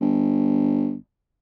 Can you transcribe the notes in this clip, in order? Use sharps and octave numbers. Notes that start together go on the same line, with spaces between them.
G1